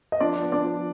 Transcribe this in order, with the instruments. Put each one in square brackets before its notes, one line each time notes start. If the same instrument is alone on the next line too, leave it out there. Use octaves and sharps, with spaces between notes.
[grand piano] D#5
F3 D4 D5
B3
D4 D5
F3